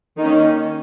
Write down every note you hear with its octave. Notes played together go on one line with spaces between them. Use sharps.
D#3 A#3 C#4 D#4